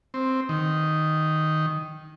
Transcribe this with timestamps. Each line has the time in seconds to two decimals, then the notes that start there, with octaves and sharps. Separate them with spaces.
0.14 C4
0.49 D#3